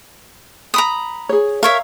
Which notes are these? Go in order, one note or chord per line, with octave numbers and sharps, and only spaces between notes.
A#5 B5 D#6
G#4 C#5
A#4 C#5 E5 F5